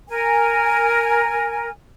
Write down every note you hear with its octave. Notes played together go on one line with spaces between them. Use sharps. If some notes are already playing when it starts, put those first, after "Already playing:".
A#4 G#5